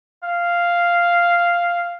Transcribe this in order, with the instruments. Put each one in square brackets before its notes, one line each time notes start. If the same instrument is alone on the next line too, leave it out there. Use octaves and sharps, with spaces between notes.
[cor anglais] F5